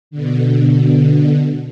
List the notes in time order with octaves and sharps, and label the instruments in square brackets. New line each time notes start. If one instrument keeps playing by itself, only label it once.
[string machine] B2 D3